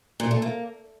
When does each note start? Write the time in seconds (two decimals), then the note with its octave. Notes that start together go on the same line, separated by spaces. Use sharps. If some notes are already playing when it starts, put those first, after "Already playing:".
0.20 A#2
0.31 A3
0.42 A#3